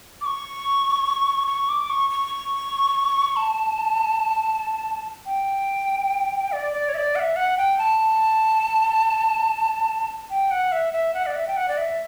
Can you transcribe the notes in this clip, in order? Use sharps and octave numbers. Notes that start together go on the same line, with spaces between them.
D6
C#6
C#6
D6
C#6
C#6
A5
G5
D5
D5
C#5
E5
D5
F#5
E5
F#5
G5
A5
G5
F#5
E5
E5
F#5
D5
E5
G5
F#5
D5
E5